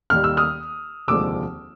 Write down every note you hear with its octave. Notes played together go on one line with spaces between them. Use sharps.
D#2 D#3 G3 F6
E6
D#6 F6
F1 D#2 D3 F3 G#3 D6 E6